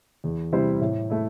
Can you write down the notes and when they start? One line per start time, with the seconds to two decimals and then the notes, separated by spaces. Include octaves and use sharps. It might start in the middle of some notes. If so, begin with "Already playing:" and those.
0.24 E2
0.53 C3 G3 E4 C5
0.81 A2
1.10 A3 E4